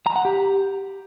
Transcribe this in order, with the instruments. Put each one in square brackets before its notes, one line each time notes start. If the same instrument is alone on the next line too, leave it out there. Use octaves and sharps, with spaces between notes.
[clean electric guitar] A#5
F#5
G4